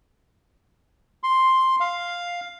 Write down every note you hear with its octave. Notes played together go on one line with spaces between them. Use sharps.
C6
F5